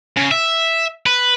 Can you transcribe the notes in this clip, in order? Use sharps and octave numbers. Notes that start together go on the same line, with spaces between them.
C#3
E5
B4